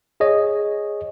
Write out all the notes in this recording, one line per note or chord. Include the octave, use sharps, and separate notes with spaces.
G#4 C#5 D#5